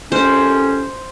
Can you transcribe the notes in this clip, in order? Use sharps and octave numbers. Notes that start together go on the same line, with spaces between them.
C2 F2 C#4 C5